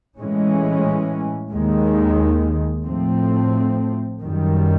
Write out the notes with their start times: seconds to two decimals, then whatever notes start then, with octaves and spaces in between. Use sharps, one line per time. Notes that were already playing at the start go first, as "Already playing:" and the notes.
0.17 A2 E3 G#3 C#4
1.52 D#2 D#3 G#3
2.85 A2 F3 A3 C4
4.19 F#2 D#3 G3